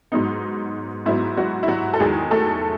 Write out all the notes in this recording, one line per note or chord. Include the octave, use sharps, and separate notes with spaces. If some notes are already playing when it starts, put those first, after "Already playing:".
G#2 F#3 B3 D#4
G#2 F#3 B3 E4
F#3 F#4
E4
F#3 F#4
A4
E2 D#3 F#3 G#3 G#4
A3 A4